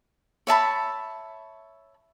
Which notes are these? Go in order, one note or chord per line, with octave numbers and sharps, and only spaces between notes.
C#5 E5 A5 B5